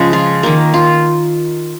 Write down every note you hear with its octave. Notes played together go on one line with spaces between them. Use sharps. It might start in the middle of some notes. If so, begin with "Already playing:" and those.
Already playing: C#3 F3 G#3
F4
D#3 A#3
F4